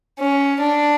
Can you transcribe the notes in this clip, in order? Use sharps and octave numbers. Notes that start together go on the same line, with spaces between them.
C#4
D4